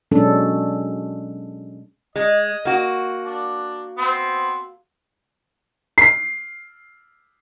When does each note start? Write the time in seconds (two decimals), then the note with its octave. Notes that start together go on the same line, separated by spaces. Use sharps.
0.11 B2 F#3 G#3 C#4 D4 A4
2.16 G#3 D#5
2.65 A#3 F#4
3.24 D4
3.98 B3 C4
5.98 C7